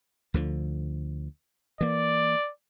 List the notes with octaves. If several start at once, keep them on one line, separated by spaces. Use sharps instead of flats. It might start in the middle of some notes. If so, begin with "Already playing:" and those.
D2 D3 F3
E3 A#3 D5